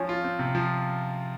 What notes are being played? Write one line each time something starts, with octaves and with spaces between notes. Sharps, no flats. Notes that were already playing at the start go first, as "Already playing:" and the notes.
Already playing: F3 C#4
F4
C4
C3
F3